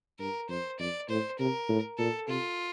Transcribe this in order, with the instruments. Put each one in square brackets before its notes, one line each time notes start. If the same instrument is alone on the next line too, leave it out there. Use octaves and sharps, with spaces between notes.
[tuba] G2 [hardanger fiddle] A#4
[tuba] F2 [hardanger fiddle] C5
[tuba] F2 [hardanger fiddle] D5
[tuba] A2 [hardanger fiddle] C5
[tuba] C3 [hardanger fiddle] A#4
[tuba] A2
[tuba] A#2 [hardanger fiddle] A4
[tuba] C3 [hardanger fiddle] F4